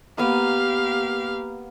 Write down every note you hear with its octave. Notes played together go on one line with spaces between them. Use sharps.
A#3 B3 G4 F5 D#6